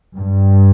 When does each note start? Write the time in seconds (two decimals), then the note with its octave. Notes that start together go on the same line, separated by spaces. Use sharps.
0.17 G2